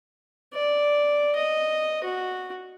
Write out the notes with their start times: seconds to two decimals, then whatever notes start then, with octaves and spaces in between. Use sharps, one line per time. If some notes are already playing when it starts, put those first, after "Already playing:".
0.54 D5
1.35 D#5
2.04 F#4